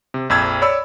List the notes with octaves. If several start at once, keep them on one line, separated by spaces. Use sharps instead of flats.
C3
A#1 F2 E6 G#6
C#5 D5 B5 E6